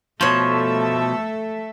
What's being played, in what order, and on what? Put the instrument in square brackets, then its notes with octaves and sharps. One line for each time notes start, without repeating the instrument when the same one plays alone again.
[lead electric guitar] B2 F3 [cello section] A3 A4 E5 [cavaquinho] C5 C#5